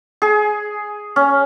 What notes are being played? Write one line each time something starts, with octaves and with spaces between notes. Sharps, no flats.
G#4
C#4